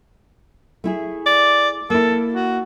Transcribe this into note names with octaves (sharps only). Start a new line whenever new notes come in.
A3 E4 G#4
D5
A#3 E4 A4
F#4